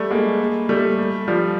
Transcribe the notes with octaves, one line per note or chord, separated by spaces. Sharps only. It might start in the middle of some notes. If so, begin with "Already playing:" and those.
Already playing: G3 A3
G#3 A#3
G3 A3
F3 G3